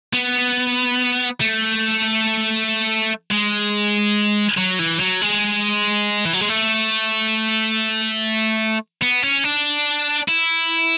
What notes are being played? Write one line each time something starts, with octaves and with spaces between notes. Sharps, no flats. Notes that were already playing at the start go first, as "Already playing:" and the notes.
B3
A3
G#3
F#3
E3
F#3
G#3
E3
F#3
G#3
A3
B3
C#4
D4
E4